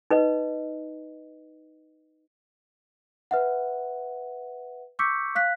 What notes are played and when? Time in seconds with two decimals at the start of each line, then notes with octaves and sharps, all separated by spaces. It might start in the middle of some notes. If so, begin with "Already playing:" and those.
0.10 D#4 B4 D#5
3.31 B4 E5 F#5
4.99 C#6 D6 E6 G6 B6 C#7
5.35 F5 F#6 B6